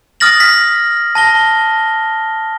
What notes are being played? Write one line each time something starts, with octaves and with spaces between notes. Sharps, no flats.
D#6 F6 A6 A#6 F#7
B6
A5 A#6 G7